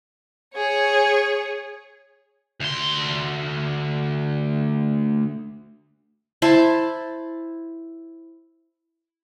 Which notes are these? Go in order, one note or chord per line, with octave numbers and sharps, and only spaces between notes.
G#4 C#5
D2 C6
E4 C5 A5